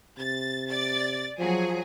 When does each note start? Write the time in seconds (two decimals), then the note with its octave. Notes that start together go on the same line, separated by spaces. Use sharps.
0.18 C3 A6
0.68 D5 A6
1.39 F3 F#3 G#4